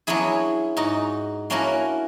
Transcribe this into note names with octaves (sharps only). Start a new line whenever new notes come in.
F#3 B3 C#4 D4 E4 G#4
G#2 D#4 F#4
A#3 C#4 D4 E4 F#4 A#4